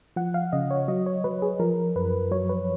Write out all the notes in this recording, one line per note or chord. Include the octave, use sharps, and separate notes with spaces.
F3 F#5
F5
C#3 D#5
C#5
F#3 D#5
C#5
F#3 B4
G#4
F3 A#4
F#2 B4
F#3 C#5
B4